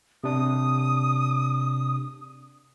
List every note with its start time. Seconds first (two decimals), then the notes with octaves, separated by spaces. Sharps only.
0.24 C3 D4 D#6